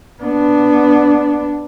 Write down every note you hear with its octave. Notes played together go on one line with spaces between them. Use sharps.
B3 D4